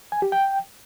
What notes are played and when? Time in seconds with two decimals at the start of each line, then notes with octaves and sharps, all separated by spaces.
0.12 G#5
0.22 G4
0.32 G5